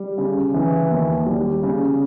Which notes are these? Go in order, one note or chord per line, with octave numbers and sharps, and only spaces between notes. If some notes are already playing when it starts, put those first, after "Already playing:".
Already playing: G3
C#3
E3
D#2
G3
C#3